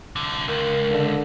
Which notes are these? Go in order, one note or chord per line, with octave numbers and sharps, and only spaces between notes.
C2 D3
C#2 A#4
D3